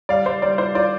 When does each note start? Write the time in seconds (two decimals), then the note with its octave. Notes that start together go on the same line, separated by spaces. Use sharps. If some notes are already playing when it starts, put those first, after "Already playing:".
0.09 G3 D5 F5
0.26 G3 C5
0.42 G3 D5
0.58 F4 C5
0.75 F4 D5